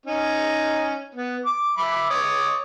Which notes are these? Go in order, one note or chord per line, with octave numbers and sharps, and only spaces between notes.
C#4 D#4
B3
D6
E5 B5 D6
C#5 D6 D#6